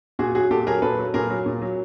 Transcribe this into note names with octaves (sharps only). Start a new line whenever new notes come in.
A#2 F#4 G#4
F#3 F#4 G#4
A#2 G4 A4
F#3 G#4 A#4
A#2 A4 B4
F#3
A#2 G#4 A#4
F#3
A#2
F#3